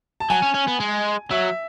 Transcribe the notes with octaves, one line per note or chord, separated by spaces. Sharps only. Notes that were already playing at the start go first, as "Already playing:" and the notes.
A5
F#3 G#5
C#4
C#4
B3
G#3
F#3 E5